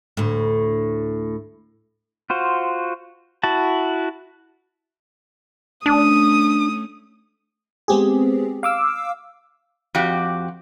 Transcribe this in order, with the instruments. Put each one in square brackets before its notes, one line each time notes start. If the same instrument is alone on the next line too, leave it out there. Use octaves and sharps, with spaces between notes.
[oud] D2 A2
[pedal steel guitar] F4 F#4 C5
E4 F#4 A5
[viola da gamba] A3 C#4 [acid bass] D4 [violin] D#6
[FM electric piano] G#3 B3 C4 G4 G#4
F5 D6 E6
[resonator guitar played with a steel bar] F2 F#4 G4